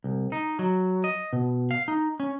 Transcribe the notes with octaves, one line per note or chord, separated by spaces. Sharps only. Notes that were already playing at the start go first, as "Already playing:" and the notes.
C2
D#4
F#3
D#5
B2
F5
D#4
C#4